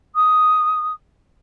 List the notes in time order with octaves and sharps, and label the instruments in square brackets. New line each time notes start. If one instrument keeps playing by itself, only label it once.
[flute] D#6